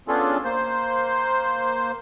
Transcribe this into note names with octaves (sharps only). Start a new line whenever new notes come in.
B3 C#4 D4 F4 G#4 A4
A#3 C5